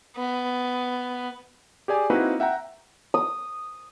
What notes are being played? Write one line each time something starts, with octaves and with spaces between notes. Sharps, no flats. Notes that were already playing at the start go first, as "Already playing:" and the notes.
B3
G4 G#4 D5 G#5
A#3 C4 D#4 E4 F#4 B4
E5 F#5 G5 A#5
D#6